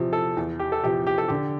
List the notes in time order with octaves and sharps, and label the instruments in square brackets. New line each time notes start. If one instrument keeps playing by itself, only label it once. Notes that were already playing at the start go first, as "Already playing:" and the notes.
Already playing: [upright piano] E2 C3 F3
[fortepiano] A4
[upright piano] E2
[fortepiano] G4
A4
[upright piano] C3 F3 [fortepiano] G4
[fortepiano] G4
A4
[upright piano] D3 [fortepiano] G4